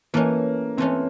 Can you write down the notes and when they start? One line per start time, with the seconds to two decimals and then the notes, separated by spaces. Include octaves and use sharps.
0.14 E3 A3 A#3 C#4
0.77 E3 A3 C4 C#4